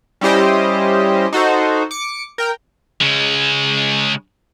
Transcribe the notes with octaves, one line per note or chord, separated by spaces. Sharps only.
G3 C#4 E4 G4 C5 D#5
D#4 F#4 A4 C5
D6 C#7
A#4 G5
C#3 G#3